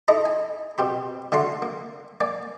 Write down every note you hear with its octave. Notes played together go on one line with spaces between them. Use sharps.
D#4 E4 A4 D#5 A#5 B5
G#5
B2 C4 G4 B5
D3 A3 F#4 A#5 C6
A#3
A#3 D5 G#5